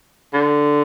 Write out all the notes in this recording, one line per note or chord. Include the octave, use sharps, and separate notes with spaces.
D3